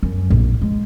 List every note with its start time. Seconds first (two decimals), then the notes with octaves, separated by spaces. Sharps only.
0.03 F#2
0.30 A#1
0.61 G#3